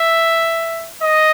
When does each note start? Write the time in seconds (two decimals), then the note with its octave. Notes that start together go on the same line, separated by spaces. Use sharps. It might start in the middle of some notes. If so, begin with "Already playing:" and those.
Already playing: E5
1.02 D#5